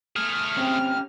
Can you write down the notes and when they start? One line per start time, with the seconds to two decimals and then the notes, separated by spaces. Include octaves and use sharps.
0.16 A3 G#4 F6
0.58 C4 C#4 G4